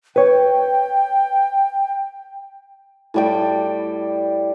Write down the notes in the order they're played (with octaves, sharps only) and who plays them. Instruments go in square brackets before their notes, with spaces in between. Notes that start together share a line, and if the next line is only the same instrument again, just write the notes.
[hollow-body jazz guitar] B4 C#5 [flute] G5
[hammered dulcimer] A2 G3 G5